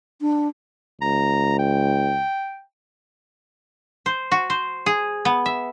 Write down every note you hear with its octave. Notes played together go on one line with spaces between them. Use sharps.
D4
C#2 A#5
G5
C5
F#4
C5
G#4
B3
E5